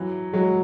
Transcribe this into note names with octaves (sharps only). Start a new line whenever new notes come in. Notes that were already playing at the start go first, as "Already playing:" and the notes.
Already playing: E3 F#3
F#3 G#3